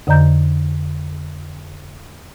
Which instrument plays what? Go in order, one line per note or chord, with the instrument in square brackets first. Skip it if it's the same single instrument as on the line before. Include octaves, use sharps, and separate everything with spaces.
[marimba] F2 D3 D5 D#5 A#5 G6